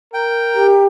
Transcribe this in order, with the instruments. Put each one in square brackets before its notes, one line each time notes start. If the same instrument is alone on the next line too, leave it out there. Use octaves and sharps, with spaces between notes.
[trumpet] A#4 [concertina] G5
[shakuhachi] G4